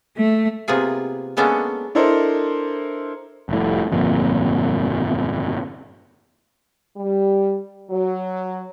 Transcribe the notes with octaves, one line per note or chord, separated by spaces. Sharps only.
A3
C3 A#3 B3 F4 G#4
G#3 A#3 B3 C#4 D4 A4
D4 E4 A4 A#4 C5 D#5
F1 A2
G1 F2 A#2
G3
F#3